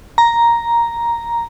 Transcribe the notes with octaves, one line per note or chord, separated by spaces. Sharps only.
A#5